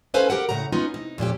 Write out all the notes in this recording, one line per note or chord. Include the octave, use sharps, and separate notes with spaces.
C#4 A4 B4 C5 F5 G#5
G4 A#4 F#5 G5
A2 C#3 F#5 A#5
B3 C#4 D#4 F4
C3 D#4
F2 A#2 C#4 G4